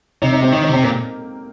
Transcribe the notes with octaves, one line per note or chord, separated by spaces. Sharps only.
C3 D#4
D#4
C4
D#3 D#4
D#4
C3 C4
A#2 A#3